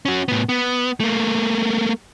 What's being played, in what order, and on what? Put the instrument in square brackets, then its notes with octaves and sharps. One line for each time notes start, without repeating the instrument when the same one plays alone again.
[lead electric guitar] C#4 F#4
A2 B3
B3
A3 A#3